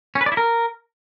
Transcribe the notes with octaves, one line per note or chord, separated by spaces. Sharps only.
C#4
B4
D5
E4
A#4